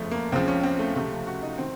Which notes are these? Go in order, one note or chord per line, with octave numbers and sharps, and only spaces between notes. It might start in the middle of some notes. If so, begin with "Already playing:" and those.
Already playing: F#1 F2 C#3 F3 A3
A#3
C#2 C#3 F3 C4
C#4
C4
A3
C#2 C3 F3 A3
F#4
D#4
D#3 C4